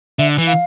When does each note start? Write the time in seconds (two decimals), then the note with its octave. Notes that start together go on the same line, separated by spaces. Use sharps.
0.19 D3 E5
0.38 E3
0.47 F5